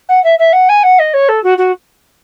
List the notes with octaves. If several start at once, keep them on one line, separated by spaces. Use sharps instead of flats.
F#5
E5
E5
F#5
G#5
F#5
D#5
C#5
A4
F#4
F#4